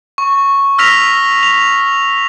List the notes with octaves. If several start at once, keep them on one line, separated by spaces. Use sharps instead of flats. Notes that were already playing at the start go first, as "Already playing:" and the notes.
C#6
E6 F6 A#6 B6 F7
F7